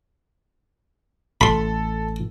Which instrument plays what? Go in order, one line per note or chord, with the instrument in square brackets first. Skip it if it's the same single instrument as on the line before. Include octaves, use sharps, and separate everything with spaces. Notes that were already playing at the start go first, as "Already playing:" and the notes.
[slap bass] A1 [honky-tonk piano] A4 [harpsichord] B5 C6